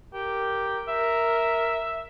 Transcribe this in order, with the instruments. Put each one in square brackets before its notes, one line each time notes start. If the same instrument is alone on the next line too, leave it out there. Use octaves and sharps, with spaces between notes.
[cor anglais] G4 [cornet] A#4
[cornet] A#4 [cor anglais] E5